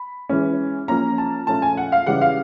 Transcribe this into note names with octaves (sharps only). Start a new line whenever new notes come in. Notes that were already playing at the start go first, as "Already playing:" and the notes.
Already playing: B5
E3 G#3 C#4
F3 A#3 C#4 A#5
A5
A#2 F3 A3 C#4 A5
G#5
F#5
F5
C#3 E3 G3 F#5
F5